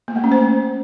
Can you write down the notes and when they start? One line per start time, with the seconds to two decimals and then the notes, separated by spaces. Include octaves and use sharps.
0.08 A#3
0.16 A3
0.24 C#4
0.32 C5